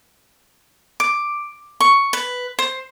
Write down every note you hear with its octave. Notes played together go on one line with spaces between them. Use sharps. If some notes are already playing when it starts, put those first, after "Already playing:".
D6
C#6
B4
C5